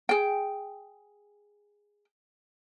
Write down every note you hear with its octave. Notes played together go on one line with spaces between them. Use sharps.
G#4 G5